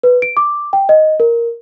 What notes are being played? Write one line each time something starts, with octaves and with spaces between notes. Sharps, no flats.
B4
D7
D6
G5
D#5
A#4